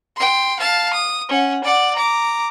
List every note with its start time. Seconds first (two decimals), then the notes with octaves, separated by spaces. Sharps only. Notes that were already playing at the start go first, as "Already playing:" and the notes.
0.16 G5 C6
0.59 F5 A5
0.93 D#6
1.29 C#4 F#5
1.64 D5 F#5
1.95 A#5 D6